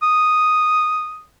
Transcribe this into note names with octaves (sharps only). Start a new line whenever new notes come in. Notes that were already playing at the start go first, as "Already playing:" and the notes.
D#6